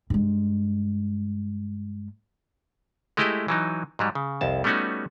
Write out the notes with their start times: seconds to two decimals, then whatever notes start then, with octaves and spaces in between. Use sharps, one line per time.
0.10 G2 G#3
3.17 G#3 A3 E4 G4 D#5
3.48 E3 F#3 D#4
3.99 G#2 F#3 G3
4.15 C#3
4.41 C2 F2 A5
4.64 G3 A3 B3 C#4 D#4 F#4